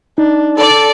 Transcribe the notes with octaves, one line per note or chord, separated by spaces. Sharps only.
D4 D#4
A4 D5